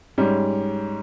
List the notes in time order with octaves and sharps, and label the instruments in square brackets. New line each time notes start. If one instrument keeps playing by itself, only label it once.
[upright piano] G#2 G3 C#4